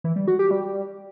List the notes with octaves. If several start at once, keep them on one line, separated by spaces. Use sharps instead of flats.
E3
G3
F#4
G4
G3